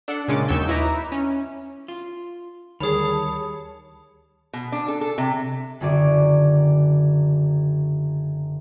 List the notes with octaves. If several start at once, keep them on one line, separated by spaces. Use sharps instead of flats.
D4 A4 F#5
A#2 C#3 G#3 C#4 D6 A6
D#2 F#3 C#6 E6 G6
D#4 E4 B4 E5 A#5 D6
C#4
F4
D2 D#3 G3 G#4 C#5 A5 B5 D#6
B2
D4
A4
A4
C3
F#1 F#2 D3 C#4 F#4 D5